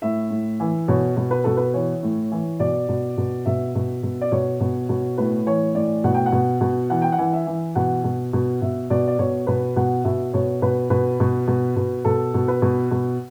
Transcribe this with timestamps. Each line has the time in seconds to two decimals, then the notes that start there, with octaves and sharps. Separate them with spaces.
0.02 A2 E5
0.30 A2
0.60 E3
0.88 B2 C#5
1.17 B2
1.31 B4
1.44 B2 A4
1.57 B4
1.74 E3 C#5
2.03 A2
2.32 E3
2.59 B2 D5
2.88 B2
3.17 B2
3.46 B2 E5
3.75 B2
4.03 B2
4.21 D5
4.32 B2 C#5
4.60 B2
4.89 B2
5.18 A2 B4
5.46 E3 C#5
5.75 A2 D5
6.04 B2 F#5
6.14 G5
6.26 F#5
6.32 B2
6.61 B2
6.90 E3 F#5
7.02 G5
7.12 F#5
7.18 E3
7.33 E5
7.46 E3
7.75 B2 F#5
8.04 B2
8.33 B2
8.62 B2 E5
8.90 B2 D5
9.08 D5
9.19 B2 C#5
9.47 B2 B4
9.76 B2 F#5
10.04 B2 E5
10.33 B2 C#5
10.62 B2 B4
10.90 B2 B4
11.20 B2
11.47 B2
11.76 B2
12.05 B2 A4
12.34 B2
12.48 B4
12.62 B2
12.91 B2